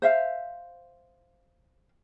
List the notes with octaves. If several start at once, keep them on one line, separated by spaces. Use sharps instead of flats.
C5 E5 F5